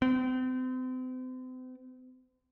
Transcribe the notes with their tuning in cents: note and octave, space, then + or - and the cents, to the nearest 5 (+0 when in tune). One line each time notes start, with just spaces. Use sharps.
C4 -40